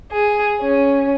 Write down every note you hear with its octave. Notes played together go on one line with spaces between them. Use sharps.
G#4
C#4